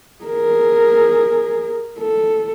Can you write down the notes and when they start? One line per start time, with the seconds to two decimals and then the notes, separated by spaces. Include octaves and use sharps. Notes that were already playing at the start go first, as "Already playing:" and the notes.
0.24 G#4 A#4
1.99 A4